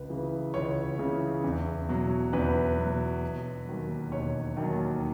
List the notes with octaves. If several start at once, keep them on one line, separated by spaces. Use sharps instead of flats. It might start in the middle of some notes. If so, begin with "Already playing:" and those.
Already playing: C#2 B4
C#3 E3
C#2 C#5
C#3 E3
E2
B2 F#3
E2 B4
B2 F#3
E1
D#2 D#3 F#3
E1 C#5
D#2 D#3 F#3